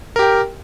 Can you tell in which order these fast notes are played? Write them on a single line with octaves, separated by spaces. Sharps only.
A#4 G4 G5